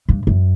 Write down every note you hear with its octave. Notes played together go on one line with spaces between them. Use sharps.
G2
F#2